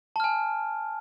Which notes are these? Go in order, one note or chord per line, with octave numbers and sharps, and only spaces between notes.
G#5 A5 F6